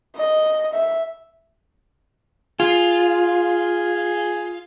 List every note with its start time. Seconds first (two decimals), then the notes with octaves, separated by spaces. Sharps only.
0.16 D#5
0.74 E5
2.60 F4 G#4